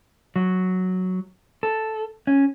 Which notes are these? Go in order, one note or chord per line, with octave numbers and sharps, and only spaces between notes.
F#3
A4
C#4